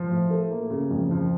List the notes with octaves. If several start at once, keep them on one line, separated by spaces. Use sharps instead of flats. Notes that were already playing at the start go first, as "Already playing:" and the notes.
Already playing: F3
A2
A3
A#3
C#3
F2
F3